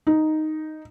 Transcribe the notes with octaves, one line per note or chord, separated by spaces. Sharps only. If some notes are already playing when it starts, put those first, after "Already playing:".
D#4